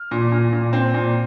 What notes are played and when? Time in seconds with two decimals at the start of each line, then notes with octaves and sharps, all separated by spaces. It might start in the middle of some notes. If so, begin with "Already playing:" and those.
Already playing: F6
0.11 A#2
0.32 A#2
0.53 A#2
0.73 C4
0.94 A#2